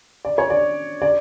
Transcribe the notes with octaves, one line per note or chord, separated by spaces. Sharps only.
D5
C#5
D5
D5